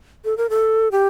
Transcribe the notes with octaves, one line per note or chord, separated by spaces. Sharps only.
A4
A#4
A4
G4